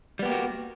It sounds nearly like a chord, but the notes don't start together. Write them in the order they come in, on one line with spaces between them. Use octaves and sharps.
G3 B3 G4 A#3 F#4